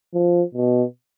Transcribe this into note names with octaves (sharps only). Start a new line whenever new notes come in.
F3
B2